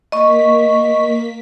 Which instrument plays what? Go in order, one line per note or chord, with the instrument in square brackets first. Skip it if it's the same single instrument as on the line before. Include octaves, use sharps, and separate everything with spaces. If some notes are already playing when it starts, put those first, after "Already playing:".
[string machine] A#3 B6 [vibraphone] D#5 C#6